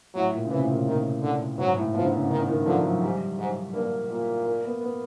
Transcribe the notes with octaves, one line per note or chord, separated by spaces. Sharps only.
A2 F#3
A#2
C#3
C3 E3
A2
A#2
A#2 D#3
D3
G#2 F#3
A2
B2 F3
D3
C#3
D3 D#3
D#3
D3 F3
F#3
G#2 G3
G#2
G2 A#3
A#2
A#3
B3
B3